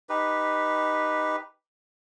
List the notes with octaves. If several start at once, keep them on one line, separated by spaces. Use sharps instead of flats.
D#4 G4 B4